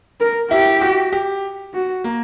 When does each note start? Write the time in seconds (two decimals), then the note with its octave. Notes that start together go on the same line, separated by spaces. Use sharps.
0.20 A#4
0.51 E4 G4
0.81 F#4
1.12 G4
1.74 F#4
2.04 A#3